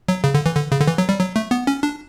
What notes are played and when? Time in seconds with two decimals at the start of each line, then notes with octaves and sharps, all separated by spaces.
0.08 F#3
0.24 C#3
0.34 D3
0.46 E3
0.55 D3
0.72 C#3
0.81 D3
0.88 E3
0.98 F#3
1.09 G3
1.20 F#3
1.36 A3
1.51 B3
1.67 C#4
1.83 D4